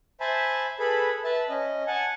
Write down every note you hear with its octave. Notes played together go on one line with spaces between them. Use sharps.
C5 E5 G#5 A5 B5
G#4 A4 B4 B5
B4 E5 A5
C#4 D#5
F#5 G#5 A5